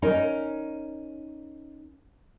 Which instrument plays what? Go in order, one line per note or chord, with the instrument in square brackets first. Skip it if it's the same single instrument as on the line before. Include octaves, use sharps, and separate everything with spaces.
[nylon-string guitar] C#4 D#4 A#4